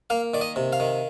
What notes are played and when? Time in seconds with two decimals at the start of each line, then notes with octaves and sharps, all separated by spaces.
0.10 A#3 F5
0.34 D#3 D5
0.41 D#5
0.56 C3
0.73 F5
0.80 D#3